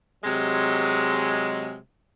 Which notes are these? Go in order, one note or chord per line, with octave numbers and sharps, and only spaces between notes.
C3 F#3 G#3